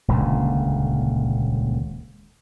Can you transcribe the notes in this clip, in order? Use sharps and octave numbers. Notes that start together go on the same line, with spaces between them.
D#1 C#2 A#2 D3